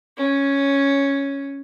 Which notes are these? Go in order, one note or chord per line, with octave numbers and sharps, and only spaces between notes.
C#4